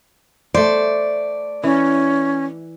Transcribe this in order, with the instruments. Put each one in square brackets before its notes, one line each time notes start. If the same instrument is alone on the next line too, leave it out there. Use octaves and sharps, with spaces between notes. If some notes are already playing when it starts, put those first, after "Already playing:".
[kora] A3 C5 [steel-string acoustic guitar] D5
[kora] E3 [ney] C#4